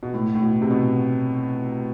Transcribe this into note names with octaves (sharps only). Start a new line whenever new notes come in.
B2
A2
A2
B2
C3
B2